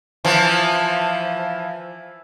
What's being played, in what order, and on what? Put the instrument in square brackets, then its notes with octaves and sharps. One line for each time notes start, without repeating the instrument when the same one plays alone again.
[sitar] E3 F3